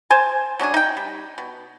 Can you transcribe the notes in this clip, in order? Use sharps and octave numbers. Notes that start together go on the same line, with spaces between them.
C5 G#5 A5
F#3 C#4 D4 G#4
D#4 G5
G3
B2